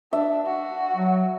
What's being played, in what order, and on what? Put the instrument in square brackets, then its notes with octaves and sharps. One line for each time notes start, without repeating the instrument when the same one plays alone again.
[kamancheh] D4 [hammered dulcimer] E5
[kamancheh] F#4
[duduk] F#3